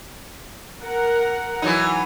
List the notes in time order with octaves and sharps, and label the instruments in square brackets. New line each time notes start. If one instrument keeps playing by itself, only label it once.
[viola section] A#4 F#5
[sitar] E3 F#3 D#4